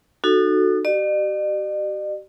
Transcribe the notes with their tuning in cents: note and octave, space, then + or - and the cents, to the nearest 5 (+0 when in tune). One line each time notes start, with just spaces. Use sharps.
D#4 -40 F#4 +0 A4 +0
G4 -40 D5 +45